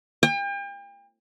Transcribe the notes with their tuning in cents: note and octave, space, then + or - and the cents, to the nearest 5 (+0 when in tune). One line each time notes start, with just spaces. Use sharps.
G5 +40